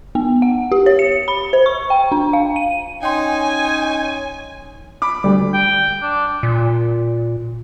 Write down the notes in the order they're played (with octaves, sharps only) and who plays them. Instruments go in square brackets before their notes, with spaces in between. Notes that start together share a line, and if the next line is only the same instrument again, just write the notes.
[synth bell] B3
F#5
G4
C#5
C#7
B5
C5
C#6
G5
D4
F5
D#7
[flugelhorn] C#4 [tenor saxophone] D#4 [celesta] G5 C6 [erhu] G#5
[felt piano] B5 D6
[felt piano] D2 [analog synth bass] G3
[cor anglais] G5
D4
[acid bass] A#2